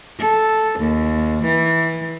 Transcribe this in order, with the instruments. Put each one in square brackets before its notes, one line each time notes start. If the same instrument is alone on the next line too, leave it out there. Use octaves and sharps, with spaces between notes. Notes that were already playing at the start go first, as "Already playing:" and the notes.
[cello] A4
D#2
E3